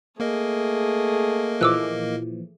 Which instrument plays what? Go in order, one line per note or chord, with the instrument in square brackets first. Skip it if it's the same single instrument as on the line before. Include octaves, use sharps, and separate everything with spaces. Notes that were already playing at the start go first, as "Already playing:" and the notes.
[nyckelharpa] A3 G#4 [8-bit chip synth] A#3 A#4 D#5
[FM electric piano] A#2 E3 F3 [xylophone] D6 E6 F#6